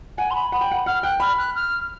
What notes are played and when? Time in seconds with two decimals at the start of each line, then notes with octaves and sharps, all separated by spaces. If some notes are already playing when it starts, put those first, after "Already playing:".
0.17 F#5 G#5
0.30 C6
0.35 B5
0.52 F#5 B5
0.61 G5
0.72 F#5
0.86 F#5 F6
1.03 G5 F#6
1.20 B5 F6
1.38 F#6
1.55 F6